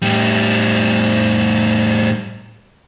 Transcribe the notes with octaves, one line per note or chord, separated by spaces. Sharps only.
A2 G3